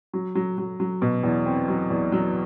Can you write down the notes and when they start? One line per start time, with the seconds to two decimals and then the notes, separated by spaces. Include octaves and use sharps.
0.13 F#3
0.35 F#3
0.58 F#3
0.80 F#3
1.02 B2
1.23 E2
1.46 C4
1.68 F#3
1.90 E2
2.12 F#3